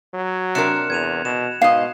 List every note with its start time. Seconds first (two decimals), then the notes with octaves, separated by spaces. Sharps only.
0.14 F#3
0.55 C3 D4 A#4 F#6 C#7 E7
0.90 E2 G#6 D#7 F7
1.25 B2 E7
1.62 G#2 B2 D#5 F5